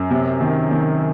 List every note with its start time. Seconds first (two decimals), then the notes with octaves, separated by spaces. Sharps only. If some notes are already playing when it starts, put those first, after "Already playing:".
Already playing: F#2
0.11 C3
0.41 D#3
0.71 D#3